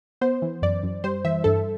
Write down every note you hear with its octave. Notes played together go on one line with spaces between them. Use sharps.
B3 C5
E3
F#2 D5
F#2
G3 C5
E3 E5
G2 A4